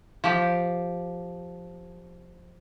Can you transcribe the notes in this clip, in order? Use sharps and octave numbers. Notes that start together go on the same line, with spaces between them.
F3 G4